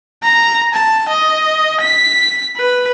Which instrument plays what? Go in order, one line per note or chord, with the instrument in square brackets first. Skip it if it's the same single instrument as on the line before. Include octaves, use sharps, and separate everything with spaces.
[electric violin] A#5
A5
D#5
B6
B4